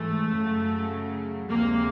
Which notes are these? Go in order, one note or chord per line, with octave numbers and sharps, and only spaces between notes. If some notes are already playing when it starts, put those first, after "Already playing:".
Already playing: G#2 E3 G#3 A3
F#2 C#3 F#3
D2 C3 F3 G#3 A#3